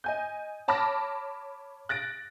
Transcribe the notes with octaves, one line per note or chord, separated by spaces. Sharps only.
D#5 G#5 G6
C#5 A5 B5 D6 F6 A#6
F#6 A6 A#6 D7